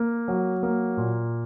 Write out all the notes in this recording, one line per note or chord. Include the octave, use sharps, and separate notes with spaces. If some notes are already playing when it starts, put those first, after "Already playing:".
Already playing: A#3
F#3
A#3
A#2